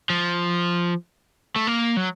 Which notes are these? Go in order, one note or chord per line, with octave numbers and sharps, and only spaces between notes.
F3
A3
A#3
F#3